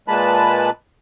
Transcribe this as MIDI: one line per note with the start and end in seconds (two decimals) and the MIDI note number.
0.08 0.70 46
0.08 0.70 56
0.08 0.70 58
0.08 0.70 71
0.08 0.70 81
0.08 0.70 83